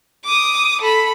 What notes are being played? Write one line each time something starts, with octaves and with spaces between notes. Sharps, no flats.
D6 D#6
A4 B5